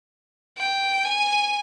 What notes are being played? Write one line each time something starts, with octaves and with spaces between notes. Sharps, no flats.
G5
G#5